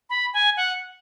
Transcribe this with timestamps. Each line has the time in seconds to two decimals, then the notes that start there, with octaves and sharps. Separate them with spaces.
0.10 B5
0.33 G#5
0.57 F#5